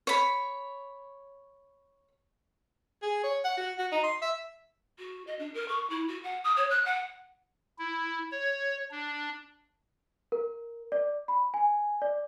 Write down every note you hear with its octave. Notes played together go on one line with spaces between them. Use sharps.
C#5 B5
G#4
C#5
F#5
F#4
F#4
D#4
C6
E5
F#4
D#5
D4
A#4
C#6
E4
F#4
F#5
D#6
C#5
F#6
F#5
E4
C#5
D4
A#4
D5
B5
G#5
D5